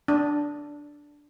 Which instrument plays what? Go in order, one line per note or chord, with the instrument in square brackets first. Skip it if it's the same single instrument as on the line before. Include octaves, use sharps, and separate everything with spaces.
[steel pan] D4